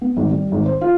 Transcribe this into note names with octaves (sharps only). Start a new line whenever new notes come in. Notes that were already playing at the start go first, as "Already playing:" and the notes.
B3
G#1
G3
G#1
C5
F4